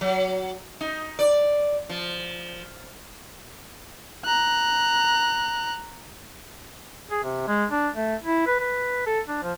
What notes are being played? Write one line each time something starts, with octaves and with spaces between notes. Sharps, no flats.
F#3
D#4
D5
F3
A#5 F#6
G#4
C3
G#3
D4
A3
E4
B4
B4
A4
D4
F3